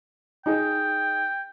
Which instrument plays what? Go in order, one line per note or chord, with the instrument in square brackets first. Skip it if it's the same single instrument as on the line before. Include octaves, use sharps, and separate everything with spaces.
[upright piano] D#4 G#4 [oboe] G5